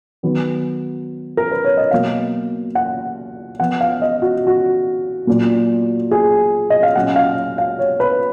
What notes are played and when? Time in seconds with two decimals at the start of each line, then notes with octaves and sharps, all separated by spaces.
0.23 D#3 F#3 B3
1.37 A#4
1.51 B4
1.64 C#5
1.77 D#5
1.91 B2 F#3 A#3 F5
2.75 F#5
3.59 F3 B3 F#5
3.81 F5
4.02 D#5
4.22 F#4
4.47 F#4
5.27 A#2 F#3 A#3
6.11 G#4
6.70 D#5
6.83 F5
6.96 A#2 F#3 C#4 F#5
7.16 F5
7.58 F5
7.79 C#5
8.00 B4